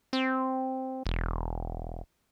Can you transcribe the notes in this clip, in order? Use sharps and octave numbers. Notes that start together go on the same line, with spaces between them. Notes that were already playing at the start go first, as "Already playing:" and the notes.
C4
E1